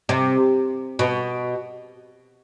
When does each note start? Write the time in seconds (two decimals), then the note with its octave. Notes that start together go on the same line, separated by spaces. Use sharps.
0.09 C3
0.99 B2